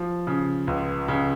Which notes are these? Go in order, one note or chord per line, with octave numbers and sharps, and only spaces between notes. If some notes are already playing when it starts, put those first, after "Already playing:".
Already playing: F3
C#3
C#2
C#3